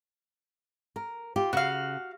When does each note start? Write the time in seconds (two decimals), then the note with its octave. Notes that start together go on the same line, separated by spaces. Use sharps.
0.96 A#4
1.36 F4 G4
1.53 C#3 F#4 F5